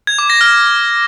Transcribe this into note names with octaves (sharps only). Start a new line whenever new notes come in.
G#6
D6
A#6
F6